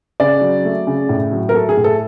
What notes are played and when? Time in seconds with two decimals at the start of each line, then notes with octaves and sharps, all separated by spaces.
0.20 C#3 D5
0.41 F#3
0.65 A3
0.87 C#3
1.09 A2
1.32 F#3
1.49 A#4
1.54 A3 A4
1.69 G#4
1.77 A2
1.84 A4